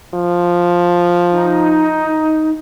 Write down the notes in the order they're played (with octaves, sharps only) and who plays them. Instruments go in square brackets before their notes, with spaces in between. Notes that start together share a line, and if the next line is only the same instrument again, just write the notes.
[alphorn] F3
[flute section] D#4